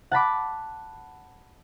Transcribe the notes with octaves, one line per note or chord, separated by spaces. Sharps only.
F#5 A5 B5 D6